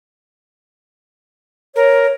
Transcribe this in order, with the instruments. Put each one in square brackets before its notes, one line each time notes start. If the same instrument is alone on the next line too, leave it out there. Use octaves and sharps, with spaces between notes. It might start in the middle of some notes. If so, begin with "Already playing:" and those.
[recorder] A#4 [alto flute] C#5